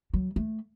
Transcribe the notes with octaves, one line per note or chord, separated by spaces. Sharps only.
F#3
A3